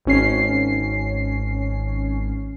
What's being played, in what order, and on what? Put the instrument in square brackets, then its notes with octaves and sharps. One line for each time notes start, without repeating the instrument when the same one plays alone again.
[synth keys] G#1 C#4 C7